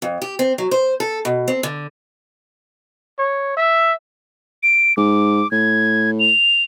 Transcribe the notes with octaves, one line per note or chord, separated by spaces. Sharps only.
F2
G4
C4
F#3
C5
A4
B2
C4
D3
C#5
E5
D7
G#2 D6
A2 G#6
F7